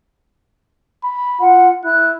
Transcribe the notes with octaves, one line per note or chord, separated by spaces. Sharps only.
B5
F4 F#5
E4 F#6